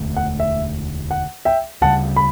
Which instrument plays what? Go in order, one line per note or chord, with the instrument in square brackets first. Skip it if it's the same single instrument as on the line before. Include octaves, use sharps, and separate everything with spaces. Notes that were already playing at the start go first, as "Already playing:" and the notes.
Already playing: [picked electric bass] E1 D2 D3 A3
[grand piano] F#5
E5
F#5
E5 G5
[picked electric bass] D2 C#3 G3 [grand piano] F#5 A5
[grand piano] B5